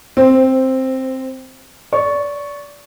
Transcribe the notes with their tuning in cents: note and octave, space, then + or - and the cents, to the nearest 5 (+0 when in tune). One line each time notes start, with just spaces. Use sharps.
C4 +5 C5 -15
D5 -25 C#6 +0